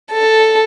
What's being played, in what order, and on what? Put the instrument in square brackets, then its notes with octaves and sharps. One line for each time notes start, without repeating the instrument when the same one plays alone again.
[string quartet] A4